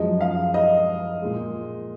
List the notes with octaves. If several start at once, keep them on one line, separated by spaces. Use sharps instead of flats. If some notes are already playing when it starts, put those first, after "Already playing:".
Already playing: F#2 F3 G#3 D#5
F5
D#5
A#2 G#3